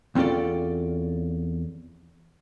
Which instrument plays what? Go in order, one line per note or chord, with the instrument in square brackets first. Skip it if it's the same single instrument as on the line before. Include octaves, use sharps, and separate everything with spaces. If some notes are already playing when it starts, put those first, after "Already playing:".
[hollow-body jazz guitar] E2 C4 C#4 F4 A4 D5